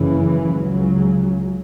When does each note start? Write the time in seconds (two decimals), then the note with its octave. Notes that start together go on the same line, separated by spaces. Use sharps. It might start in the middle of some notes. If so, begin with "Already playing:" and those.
Already playing: F#1 F#2 C#3 E3
0.56 C#2 C#3 F#3